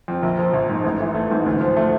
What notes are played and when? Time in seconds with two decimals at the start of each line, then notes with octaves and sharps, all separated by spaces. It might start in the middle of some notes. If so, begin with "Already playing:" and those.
0.08 F2
0.23 A#1
0.39 F3
0.53 A#1
0.70 G#2
0.84 A1
1.00 E3
1.15 A3
1.31 G#2
1.46 D2
1.61 F3
1.76 A3